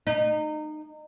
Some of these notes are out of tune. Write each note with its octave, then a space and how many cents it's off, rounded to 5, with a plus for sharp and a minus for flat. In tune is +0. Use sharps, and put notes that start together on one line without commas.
D#4 -25